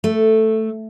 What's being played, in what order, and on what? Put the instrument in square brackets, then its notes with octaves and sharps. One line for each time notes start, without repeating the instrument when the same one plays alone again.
[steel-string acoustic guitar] A3